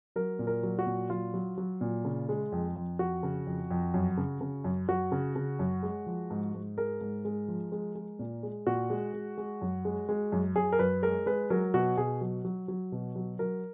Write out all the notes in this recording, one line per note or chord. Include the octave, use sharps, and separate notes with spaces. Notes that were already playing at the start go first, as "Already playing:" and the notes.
F#3 A#4
A#2
A#4
F#3
F#4
A#2
F#3 F4
F#3
F#3
A#2
C#3
G#3
F2
F2
F2 F#4
C#3
F2
F2
F#2
C#3
C#3
F#2
F#2 F#4
C#3
C#3
F#2
G#3
F3
G#2
G#2
G#3 A#4
G#2
G#3
F3
G#3
G#3
A#2
G#3
A#2 F#4
G#3
G#3
G#3
F#2
G#3
G#3
F#2
F#2 G#4
A#4
F#2 B4
G#3 A#4
G#3 B4
F#3 A#4
B2 F#4
B2 G#4
F#3
F#3
F#3
B2
F#3
F#3 A#4